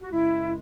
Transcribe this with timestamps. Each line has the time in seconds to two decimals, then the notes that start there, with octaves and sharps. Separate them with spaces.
0.02 F#4
0.11 F#2 C#3 G#3 E4